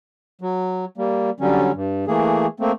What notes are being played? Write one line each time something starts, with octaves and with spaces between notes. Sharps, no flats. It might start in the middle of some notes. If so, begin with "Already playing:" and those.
F#3
G3 A#3
D3 F#3 G3 C#4
G2
E3 A3 A#3 G#4
A3 A#3 C4